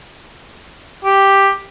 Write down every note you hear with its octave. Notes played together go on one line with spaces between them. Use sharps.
G4